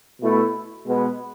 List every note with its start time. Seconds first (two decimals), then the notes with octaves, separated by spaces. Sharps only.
0.21 B2 A3 E4
0.85 B2 G#3 B3